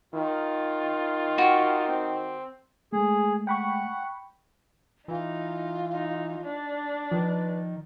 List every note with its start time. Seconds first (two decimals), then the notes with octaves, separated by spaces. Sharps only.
0.15 D#3 F4
1.38 F#4 G4 C#6
1.88 C4
2.93 G#3 A3 G#4
3.47 F#5 G5 B5 C#6
5.08 E3 D#4 F4
5.92 D#4
6.42 D4
7.11 D#3 F3 B4